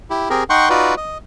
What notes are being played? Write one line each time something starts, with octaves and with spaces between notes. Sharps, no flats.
E4 G4
C4 G4 G#4 A#4
D#4 F#5 G5 C6 C#6
D#4 F4 F#4 B4 D5
D#5